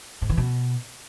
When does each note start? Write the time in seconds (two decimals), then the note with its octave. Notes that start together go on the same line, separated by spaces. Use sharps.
0.22 G#2
0.29 E3
0.37 B2